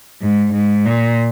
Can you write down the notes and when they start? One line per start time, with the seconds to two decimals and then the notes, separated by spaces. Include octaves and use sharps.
0.22 G#2
0.53 G#2
0.85 A#2